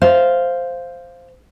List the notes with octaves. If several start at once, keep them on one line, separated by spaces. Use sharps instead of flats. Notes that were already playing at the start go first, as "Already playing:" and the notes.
C5 F5